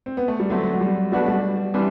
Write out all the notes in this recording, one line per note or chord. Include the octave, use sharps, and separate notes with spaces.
C4
B3
A3
G3
D3 F#3 A3 C4
F#3
G3
B2 G3 A3 D4 F#4 B4
G3
C3 E3 G3 D4